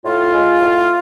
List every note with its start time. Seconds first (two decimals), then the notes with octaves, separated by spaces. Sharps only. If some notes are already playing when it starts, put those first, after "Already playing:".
0.05 A2 F4
0.33 G#3
0.60 A2